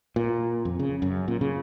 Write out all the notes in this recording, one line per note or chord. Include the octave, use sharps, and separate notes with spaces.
A#2
F2
C#3
F#2
A#2
C#3